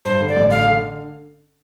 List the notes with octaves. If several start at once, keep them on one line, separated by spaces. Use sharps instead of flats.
G2 C5
D3
D5
A1
D3 F5
D3